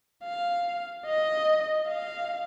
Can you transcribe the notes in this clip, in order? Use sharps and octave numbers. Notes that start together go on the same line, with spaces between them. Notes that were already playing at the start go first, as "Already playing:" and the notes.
F5
D#5
F5